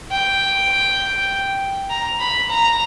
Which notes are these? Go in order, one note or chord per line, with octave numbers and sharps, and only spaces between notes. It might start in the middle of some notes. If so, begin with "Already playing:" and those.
G5
A#5
B5
A#5